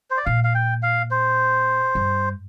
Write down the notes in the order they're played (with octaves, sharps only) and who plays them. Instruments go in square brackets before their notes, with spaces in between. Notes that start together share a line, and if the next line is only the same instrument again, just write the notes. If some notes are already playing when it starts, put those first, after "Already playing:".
[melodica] C5
D5
[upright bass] A#2 [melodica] F5
[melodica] F5
G5
F5
C5
[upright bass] G2